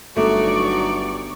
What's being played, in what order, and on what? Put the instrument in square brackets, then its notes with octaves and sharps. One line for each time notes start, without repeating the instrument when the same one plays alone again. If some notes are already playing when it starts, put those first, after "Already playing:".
[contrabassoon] G1 [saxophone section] F#3 D#4 F#4 [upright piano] A3 [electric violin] D5 C#6